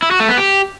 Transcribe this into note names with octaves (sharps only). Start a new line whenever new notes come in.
E4
F#4
A3
B3
G4